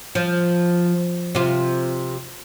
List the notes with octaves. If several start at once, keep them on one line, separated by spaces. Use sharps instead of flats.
F3
C3 F4